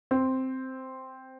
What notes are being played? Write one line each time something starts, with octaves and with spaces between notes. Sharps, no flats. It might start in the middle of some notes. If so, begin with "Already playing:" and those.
C4